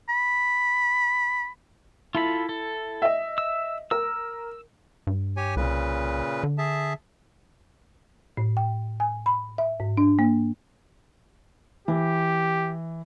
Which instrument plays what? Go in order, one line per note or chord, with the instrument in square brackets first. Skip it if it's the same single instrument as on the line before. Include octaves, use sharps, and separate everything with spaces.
[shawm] B5
[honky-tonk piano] E4 [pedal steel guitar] F4 A4 B5
[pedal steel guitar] A4
[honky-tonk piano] D#5 E5
[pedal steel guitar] E6
[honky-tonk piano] A#4 [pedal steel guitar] E6
[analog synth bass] G2
[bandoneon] G4 C#5 G#5
[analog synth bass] C2 [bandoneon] A#2 C#3 B4
[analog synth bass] D3
[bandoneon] G#4 E5 A5
[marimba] A2
G5
G#5
B5
E5
G#2
D4
A#3
[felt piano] E3 [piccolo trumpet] G4